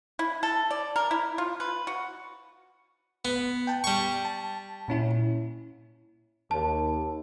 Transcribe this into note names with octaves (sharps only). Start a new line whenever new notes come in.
E4
A4
D5
A#4
E4
F4
B4
F#4
B3
G5 A5
G3 C#6
A5
A#2 C#4 E4
D#2 A5